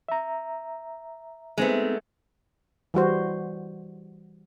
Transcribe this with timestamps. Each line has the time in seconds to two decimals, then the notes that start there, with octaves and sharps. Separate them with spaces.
0.08 E5 A#5
1.58 G#3 A3 B3 C4 D#4
2.94 E3 G3 F#4 C5